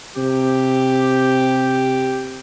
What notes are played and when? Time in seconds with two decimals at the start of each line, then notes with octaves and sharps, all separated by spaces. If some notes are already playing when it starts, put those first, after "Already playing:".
0.17 C3 G4